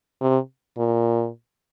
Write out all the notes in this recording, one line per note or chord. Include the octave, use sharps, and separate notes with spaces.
C3
A#2